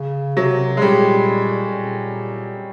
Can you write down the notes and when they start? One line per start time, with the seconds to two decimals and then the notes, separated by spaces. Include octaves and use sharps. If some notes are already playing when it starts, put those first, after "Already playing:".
Already playing: C#3
0.36 C3 F#3
0.77 G#3
0.82 A#2 G3
1.73 A#2